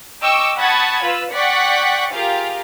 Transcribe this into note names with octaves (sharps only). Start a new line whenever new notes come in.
D#5 G5 C#6 D6 E6
F#5 A5 B5 C#6 D#6 G#6
F4 B4 E6
D5 F#5 G5 C#6 B6 C#7
F4 G4 G#4 A#4 F5